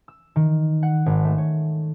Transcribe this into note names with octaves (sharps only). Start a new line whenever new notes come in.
E6
D#3
F#5
G#1
A3
C#5